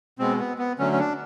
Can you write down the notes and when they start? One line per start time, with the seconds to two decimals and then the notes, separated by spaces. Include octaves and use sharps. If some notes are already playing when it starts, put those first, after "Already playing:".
0.19 B2 G#3 B3 C4
0.39 B3
0.59 B3
0.79 D3 F#3 A3 C#4
0.92 C#4
0.99 D4